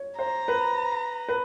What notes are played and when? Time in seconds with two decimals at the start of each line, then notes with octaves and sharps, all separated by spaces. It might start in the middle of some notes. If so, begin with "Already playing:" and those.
Already playing: C#5
0.18 C5 A#5
0.48 B4
1.28 B4